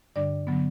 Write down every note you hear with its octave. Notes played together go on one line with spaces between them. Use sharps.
G2 D3 G3 D4 D5
D3 F#3 B3